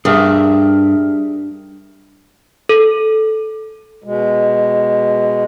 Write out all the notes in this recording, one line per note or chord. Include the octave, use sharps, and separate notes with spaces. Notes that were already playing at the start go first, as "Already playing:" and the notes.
G2 G#4 A#4 E5
A4
B2 G#3